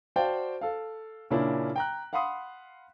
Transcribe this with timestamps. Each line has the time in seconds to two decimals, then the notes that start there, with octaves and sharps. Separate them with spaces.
0.16 F#4 C5 D5 F5 G5 A5
0.61 A4 F5
1.31 A#2 C#3 A#3 C#4 D4 E4
1.76 G5 A#5 F#6
2.13 F5 F#5 B5 C6 D#6